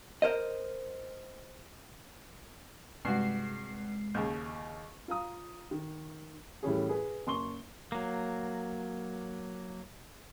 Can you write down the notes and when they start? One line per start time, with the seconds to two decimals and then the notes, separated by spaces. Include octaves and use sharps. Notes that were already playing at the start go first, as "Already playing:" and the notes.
0.22 A#4 C5 D#5
3.05 G2 C3 G#3 F#4 C7
4.14 D#2 C#3
5.08 F4 F5 A#5 D#6
5.71 D#3
6.63 A2 E3 G3 C#4 G#4
6.89 G#4 B4
7.27 F#1 C6 C#6 G7
7.92 F#3 A#3